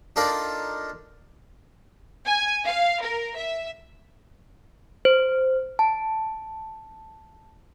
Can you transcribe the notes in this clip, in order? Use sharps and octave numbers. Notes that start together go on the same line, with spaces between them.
D4 D#4 F4 A4 A#4 D5
G#5
F5
A#4
E5
C5
A5